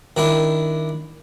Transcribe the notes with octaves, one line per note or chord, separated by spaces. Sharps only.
D#3 D4 E4